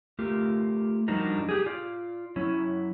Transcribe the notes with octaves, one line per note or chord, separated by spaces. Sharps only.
A3 F4 G4 A#4
F3 G3 D4 D#4 F#4 A#4
G4 G#4
F4 D5
F#3 C#4 E4